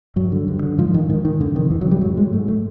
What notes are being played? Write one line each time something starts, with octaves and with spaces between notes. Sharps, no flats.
G2 F#3
D3
G2
D3
G#2 F3
D#3
G#2 D#3
D#3
F2 D3
C3 D#3
F2 E3
F#3
C3 G3
G#2 F#3
G#3
G#2 A3
A3